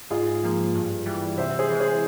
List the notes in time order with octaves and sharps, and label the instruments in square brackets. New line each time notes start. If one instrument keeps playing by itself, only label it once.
[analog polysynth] G#2 [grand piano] F4 G#4
[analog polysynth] F3 A#3
G2
E3 G3
[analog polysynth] C3 [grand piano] C5 E5
[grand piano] G#4 C5
[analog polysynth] E3 G#3
[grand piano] G#4 C5